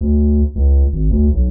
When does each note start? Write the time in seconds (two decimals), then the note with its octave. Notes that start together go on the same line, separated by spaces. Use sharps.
0.01 D2
0.55 C#2
0.93 G#1
1.11 D2
1.33 B1